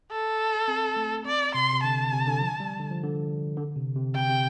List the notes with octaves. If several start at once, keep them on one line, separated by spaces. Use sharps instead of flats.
A4
C4
A3
C4 D5
C3 C6
C3
D3 A5
C3
D3
F3
G3
D3
F3
D3
D3
C3
C3
C3 G5
C3